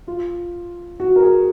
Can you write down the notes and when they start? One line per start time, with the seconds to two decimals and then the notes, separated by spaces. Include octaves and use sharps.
0.08 F4
1.00 F#4
1.16 A#4
1.23 G#4